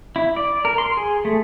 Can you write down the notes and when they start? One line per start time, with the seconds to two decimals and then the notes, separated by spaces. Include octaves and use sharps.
0.16 E4
0.36 D5
0.65 A#4
0.78 C6
0.97 G#4
1.25 A3